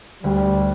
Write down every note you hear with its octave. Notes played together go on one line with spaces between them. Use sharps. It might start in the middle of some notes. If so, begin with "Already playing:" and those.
D2 G3